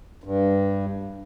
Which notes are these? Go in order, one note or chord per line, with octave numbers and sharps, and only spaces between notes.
G2